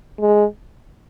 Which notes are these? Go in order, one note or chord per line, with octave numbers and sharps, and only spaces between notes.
G#3